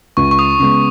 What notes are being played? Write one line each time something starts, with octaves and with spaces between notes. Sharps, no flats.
C#2 C#6
C#6
D#6
C#3 G#3 B3